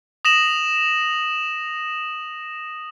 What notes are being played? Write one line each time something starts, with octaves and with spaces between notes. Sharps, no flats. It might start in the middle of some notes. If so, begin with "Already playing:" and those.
D#6 A#6 E7 F#7